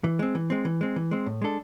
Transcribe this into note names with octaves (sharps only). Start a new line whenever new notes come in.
E3
G#3 C4
E3
G#3 C4
E3
G#3 C4
E3
G#3 C4
A2
G#3 D4 A4